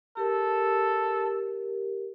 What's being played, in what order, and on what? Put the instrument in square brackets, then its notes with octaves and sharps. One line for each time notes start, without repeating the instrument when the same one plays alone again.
[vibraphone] G4 A#4 [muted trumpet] A4